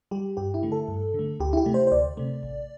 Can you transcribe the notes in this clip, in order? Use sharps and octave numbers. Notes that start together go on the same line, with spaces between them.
G3 G4
G2 G4
E4
D3 A3
A4
G2
D3 A3
D2 G4
E4
G4
C3 A3
C5
C5
D2 D5
C3 A3
A1